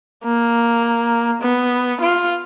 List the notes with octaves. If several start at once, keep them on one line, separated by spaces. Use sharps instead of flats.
A#3
B3
F4